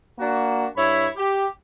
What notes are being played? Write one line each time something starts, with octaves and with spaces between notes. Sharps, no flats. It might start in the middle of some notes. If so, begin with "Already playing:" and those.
A#3 D4 F#4
G2 E4 C#5 B5
G4